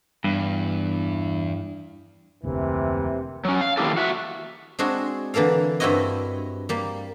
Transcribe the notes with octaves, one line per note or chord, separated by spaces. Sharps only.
E2 G2
F1 D2 C3 E3 A#3
F#3 C#4
F5
D#3 F3 A#3 E4 G4 A4
F#4 E5
G#3 C4 D4 F#4 G#4
D3 E3 A#3 A4 F5
G2 G3 C4 E4 F#4 D#5
G3 A#3